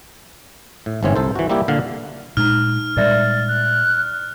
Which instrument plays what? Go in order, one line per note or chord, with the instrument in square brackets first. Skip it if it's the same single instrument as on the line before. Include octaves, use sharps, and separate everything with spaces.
[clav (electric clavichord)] A2
G1 G#2 E3 C4 C#4 C#5
C2 A4 C5
E3 F#4
G3 A#3 E4 G4
A#2 D3 F5 F#5
[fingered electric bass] A#2 G#3 [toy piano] D#4 A#5 [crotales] F6
[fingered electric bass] A#2 G3 G#3 [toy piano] A#4 D5 E5 [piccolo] A6
[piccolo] F#6